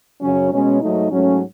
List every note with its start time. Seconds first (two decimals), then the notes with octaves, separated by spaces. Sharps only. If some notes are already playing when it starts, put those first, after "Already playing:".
0.22 F#2 C#3 F#3 C#4
0.52 B2 G#3 C#4
0.81 G#2 F#3 A3 D#4
1.12 G#2 F#3 A3 C#4